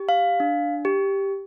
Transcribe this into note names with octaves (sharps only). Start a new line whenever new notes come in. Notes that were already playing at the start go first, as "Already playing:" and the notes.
Already playing: G4
F5
D4
G4